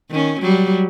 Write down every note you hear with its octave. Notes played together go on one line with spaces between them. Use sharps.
D#3 C#4
F#3 G3